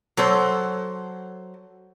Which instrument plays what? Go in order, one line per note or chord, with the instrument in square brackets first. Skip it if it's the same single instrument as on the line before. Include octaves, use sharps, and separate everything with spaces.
[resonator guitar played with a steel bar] F#3 A4 C5